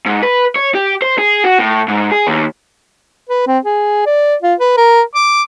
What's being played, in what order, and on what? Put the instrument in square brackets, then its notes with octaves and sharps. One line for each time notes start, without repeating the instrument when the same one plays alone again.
[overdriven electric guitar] G#2
B4
C#5
G4
C5
G#4
F#4
A2
G#2
G#4
D#2
[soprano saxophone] B4
C4
G#4
D5
F4
B4
A#4
D6